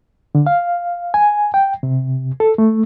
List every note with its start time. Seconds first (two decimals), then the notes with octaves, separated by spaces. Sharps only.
0.35 D3
0.46 F5
1.14 G#5
1.54 G5
1.83 C3
2.40 A4
2.58 A3